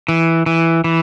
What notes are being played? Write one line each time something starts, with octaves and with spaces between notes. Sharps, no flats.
E3
E3
E3